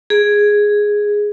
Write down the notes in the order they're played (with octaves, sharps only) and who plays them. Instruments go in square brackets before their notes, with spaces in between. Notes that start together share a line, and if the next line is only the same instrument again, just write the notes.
[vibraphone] G#4